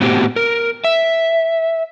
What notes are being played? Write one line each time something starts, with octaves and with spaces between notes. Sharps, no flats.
A2 B3 C4 F#4 G4
A#4
E5